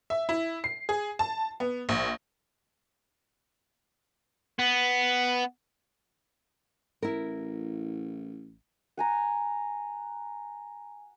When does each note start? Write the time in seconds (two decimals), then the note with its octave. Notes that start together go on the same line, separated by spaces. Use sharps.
0.10 E5
0.29 E4
0.64 C7
0.89 G#4
1.19 A5
1.60 B3
1.89 A#1
4.59 B3
7.02 A1 E4 A#4
8.97 F#5 G#5 A#5